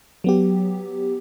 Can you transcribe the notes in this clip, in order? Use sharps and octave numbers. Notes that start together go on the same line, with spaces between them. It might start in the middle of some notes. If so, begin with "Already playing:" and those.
F#3 B3 G4